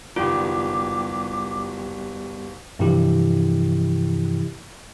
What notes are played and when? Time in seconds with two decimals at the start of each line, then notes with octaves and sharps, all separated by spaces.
0.16 F#1 D#3 G3 B3 F4 G4 D6
2.79 G2 C3 E3 F3 E4 G4